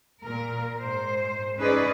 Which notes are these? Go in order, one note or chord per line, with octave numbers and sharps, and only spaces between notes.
A#2 A#4
G#2 C5
C#4 D#4 G#4 B4 D5 D#5